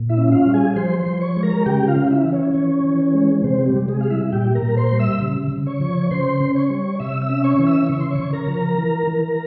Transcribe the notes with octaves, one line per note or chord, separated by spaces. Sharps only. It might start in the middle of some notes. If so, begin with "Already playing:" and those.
Already playing: A#2
E4 E5
C#4
F4 F5
G3
G#4 G#5
F3 C5 C6
C5 C6
F3
C#5 C#6
G#3
A#4 A#5
C#3 G4 G5
F4 F5
C#4
E4 E5
E3
C#4 C#5
E3
E3
G#3
C3 C4 C5
G3 G4
C3
G#3 G#4
G3 F5
E4 E5
A#2 G4 G5
A#4 A#5
A#2
C5 C6
G3
E5 E6
C#3
C#3
C#5 C#6
F3
C#3 C5 C6
C#4
C#5 C#6
G3
C3 E5 E6
E5 E6
C#4
C#5 C#6
E3
E5 E6
C#3 C#6
C6
C#5 C#6
C#3
A#4 A#5
F3
E3
E3